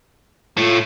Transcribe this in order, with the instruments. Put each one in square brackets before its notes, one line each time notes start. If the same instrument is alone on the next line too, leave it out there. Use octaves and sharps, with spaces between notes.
[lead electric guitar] A2 A3 [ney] F4